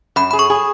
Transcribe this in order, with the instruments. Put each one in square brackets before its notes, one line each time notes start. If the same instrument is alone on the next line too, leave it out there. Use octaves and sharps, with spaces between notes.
[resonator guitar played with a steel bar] F#2 [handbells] B5
[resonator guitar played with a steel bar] G#4 [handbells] B5
[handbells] C#6
[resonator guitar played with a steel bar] G#4